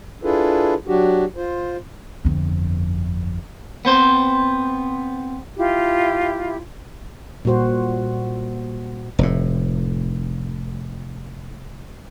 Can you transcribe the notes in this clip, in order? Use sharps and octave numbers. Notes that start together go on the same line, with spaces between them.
D4 E4 F4 G#4 A4 B4
F#3 D4 F#4 G4
F4 C5
G1 F2
B3 C4 C5
E4 F4 G4
A#2 G3 F#4 C5
F1 A2